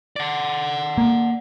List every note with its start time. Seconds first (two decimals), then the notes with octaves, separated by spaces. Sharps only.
0.16 D5 F#5
0.98 A#3